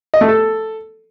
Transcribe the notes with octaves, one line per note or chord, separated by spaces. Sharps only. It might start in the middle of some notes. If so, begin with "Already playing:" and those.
D#5
A3
A4